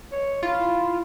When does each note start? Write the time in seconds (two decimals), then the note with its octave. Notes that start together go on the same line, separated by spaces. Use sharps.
0.12 C#5
0.43 E4 F4